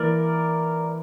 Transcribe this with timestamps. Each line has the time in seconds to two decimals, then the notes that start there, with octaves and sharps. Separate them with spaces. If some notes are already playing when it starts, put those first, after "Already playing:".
Already playing: E3 A#3 A#4 D5